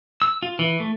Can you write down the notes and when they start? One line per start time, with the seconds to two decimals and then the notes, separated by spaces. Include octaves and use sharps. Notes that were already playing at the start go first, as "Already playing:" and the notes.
0.22 E6
0.43 F4
0.59 E3
0.80 A3